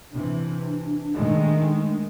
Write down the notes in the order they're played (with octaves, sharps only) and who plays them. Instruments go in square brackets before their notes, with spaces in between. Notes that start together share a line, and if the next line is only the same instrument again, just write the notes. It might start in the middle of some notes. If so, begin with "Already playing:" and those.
[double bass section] C3 E3 [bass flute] D4
[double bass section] D#3 G#3 A3